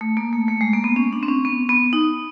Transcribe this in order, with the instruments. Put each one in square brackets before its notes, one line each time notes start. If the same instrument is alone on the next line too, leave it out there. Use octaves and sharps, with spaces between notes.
[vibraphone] A3
A#3
A3
A3
G#3
A#3
B3
C#4
D4
C4
C#4
B3
B3
D#4